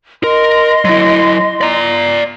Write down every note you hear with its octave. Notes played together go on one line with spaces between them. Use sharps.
A#4 D#5 C6
F#3 E4
D5 A#5